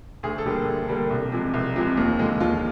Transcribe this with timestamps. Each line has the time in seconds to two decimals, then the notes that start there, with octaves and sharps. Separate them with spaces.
0.23 D2 G#4
0.38 A4
0.46 D3 G3 A#3
0.67 D2
0.89 D3 G3 A#3
1.10 C2
1.32 C3 F3 G#3
1.54 C2
1.76 C3 F3 G#3
1.97 D#2
2.19 D3 F3 G#3
2.40 D#2 F4